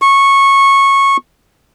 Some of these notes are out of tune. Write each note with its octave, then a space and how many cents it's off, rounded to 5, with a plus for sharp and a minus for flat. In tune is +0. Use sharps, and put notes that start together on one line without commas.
C#6 -15